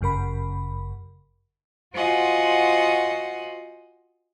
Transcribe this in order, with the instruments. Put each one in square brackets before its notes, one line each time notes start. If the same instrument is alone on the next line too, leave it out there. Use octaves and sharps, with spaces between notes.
[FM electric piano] G1 F#2 C#3 A#4 B5
[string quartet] F4 F#4 C5 D#5 F#5 G#5